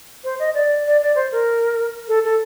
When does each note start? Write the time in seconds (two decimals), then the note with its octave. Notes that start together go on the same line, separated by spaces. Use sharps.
0.24 C5
0.39 D#5
0.54 D5
0.86 D5
1.01 D5
1.15 C5
1.32 A#4
2.08 A4
2.24 A4